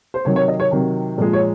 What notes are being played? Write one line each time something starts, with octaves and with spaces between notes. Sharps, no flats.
C5
C3 D#3 F#3 C#5
C#5
D#5
C#5
C3 D#3 F#3
A#2 F3 G#3
C#5